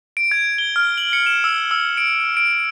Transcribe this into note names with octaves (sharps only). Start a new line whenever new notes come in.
D7
G#6
G7
F6
F#7
C#7
E7
E6
E6
D7
D7